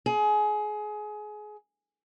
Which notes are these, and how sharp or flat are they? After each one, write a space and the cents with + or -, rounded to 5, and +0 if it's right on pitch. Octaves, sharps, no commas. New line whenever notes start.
G#4 +25